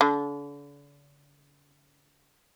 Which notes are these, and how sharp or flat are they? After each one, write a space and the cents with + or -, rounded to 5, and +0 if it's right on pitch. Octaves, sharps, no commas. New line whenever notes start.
D3 -40